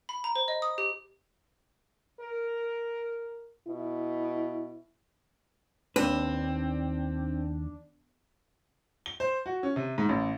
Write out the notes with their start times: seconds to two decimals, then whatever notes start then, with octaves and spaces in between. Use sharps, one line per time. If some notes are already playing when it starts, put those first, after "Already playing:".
0.09 B5
0.24 A#5
0.36 C5
0.48 D#5
0.62 D#6
0.78 G4
2.20 A#4
3.68 B2 E4
5.96 D#2 C4 D4 B4
9.06 G7
9.20 C5
9.46 F#4
9.63 C#4
9.76 C3
9.98 G#2
10.09 A1